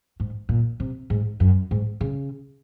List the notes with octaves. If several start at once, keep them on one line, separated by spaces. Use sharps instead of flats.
G#2
A#2
C3
G#2
F#2
G#2
C#3